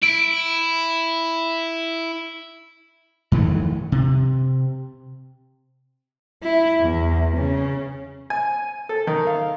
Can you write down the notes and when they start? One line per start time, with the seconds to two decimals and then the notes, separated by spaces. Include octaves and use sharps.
0.03 E4 D7
3.32 F2 D#3 E3 A3
3.92 C3
6.43 E4
6.81 E2
7.37 C#3
8.30 G#5
8.89 A4
9.07 D#3
9.27 F5